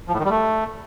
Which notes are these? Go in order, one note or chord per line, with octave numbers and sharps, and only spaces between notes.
F3
A2
D#3
G3
A3